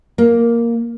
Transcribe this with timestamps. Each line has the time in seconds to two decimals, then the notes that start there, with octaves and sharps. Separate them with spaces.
0.18 A#3